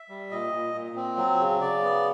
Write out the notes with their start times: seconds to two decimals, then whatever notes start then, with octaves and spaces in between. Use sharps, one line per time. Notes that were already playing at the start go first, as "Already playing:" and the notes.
Already playing: E5
0.09 G3
0.31 A#2 D#5
0.52 A#2
0.74 A#2
0.95 C4
1.17 F#3
1.40 C#3
1.61 C#3 D5
1.83 B3